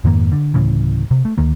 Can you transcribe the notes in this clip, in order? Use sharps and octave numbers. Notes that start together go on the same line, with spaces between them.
F2 G#2 D#3 A#3
D3
D1 A2 C#3 E3
C3
A3
D2 D#3 A#3